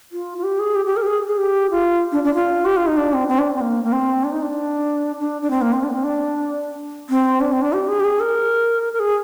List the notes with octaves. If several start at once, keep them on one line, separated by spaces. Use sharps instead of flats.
F4
F4
G4
G#4
G4
G4
A#4
G4
G#4
G#4
G4
F4
D4
D4
F4
G4
F4
D#4
D4
C4
C4
D4
C4
A#3
A#3
C4
D4
D#4
D4
D4
D4
C4
A#3
C4
D4
A#3
C4
D4
C4
D4
C4
D4
G4
G#4
G4
G#4
A#4
A#4
G#4